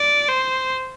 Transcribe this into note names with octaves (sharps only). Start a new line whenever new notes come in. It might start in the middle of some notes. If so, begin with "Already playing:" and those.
Already playing: D5
C5